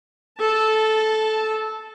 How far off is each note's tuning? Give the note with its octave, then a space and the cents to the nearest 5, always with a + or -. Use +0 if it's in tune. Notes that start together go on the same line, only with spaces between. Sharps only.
A4 -15 A5 +0